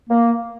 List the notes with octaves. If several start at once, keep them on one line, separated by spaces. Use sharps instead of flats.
A#3